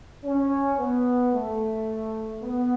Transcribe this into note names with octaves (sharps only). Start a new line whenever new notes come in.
C#4
B3
A3
B3